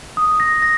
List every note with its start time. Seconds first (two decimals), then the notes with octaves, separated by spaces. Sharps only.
0.17 D#6
0.40 A#6
0.62 A#6